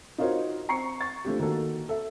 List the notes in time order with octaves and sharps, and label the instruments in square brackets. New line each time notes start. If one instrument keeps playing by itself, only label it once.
[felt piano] D#4 F4 F#4 A#4 C5 C#5
C4 A#5 C#6 C7 C#7
C#6 A6
F3 A3 D4 G4
D#3 A#3 F#4 A4
A4 E5